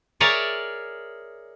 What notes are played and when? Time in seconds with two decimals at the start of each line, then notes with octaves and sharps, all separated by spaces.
0.20 G#4 A#4 C#5 D5 E5 A5